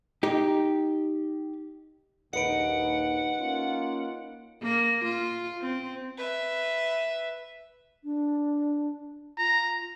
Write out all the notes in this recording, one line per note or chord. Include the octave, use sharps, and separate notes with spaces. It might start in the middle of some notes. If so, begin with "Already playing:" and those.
D#4 G4
A#1 D#2 D#4 B4 D#5 F#5 C#7 D7
A#3 C#4 F4
A#3
F4
C4
B4 E5
D4
F4 A#5